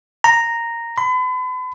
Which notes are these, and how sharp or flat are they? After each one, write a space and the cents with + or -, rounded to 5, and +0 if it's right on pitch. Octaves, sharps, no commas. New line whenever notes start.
A#5 -5
B5 +40